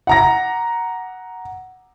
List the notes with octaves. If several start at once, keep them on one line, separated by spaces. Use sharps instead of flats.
F#5 A#5 A#6